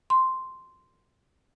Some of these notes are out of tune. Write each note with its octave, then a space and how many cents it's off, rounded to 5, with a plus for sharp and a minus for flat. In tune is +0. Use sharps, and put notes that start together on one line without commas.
C6 -5